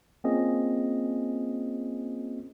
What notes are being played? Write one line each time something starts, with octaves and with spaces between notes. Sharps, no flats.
A#3 C4 C#4 F4 G#4 D#5